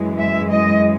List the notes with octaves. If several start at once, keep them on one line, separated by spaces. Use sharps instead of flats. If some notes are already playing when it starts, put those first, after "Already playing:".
Already playing: F#2 E3 G#3
E5
D#5